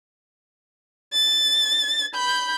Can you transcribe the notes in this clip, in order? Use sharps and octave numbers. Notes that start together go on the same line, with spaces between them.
A6
B5 G6